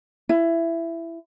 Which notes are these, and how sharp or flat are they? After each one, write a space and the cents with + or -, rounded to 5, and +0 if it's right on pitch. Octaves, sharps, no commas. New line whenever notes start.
E4 +15